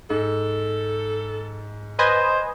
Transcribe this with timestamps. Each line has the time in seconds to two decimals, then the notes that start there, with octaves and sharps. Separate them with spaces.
0.10 G#2 A4
1.99 B4 C5 D#5 G#5